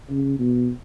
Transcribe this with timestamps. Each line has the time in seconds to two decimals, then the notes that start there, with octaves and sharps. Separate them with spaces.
0.10 C#3
0.39 B2